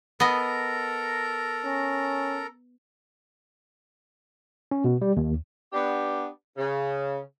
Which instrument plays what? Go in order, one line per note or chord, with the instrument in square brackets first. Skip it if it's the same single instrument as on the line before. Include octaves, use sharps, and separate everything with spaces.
[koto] B3 D#5 [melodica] A4 A#4 A#5
[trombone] C#4
[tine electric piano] C#4
B2
G3
D#2
[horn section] B3 D4 G4
C#3